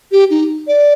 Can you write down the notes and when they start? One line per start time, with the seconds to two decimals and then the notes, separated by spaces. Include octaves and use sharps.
0.12 G4
0.30 D#4
0.67 D5